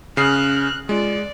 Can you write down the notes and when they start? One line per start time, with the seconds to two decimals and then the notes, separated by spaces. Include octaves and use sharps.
0.17 C#3 C#4 D#6 F6 F#6 C7
0.89 G#3 F4 D5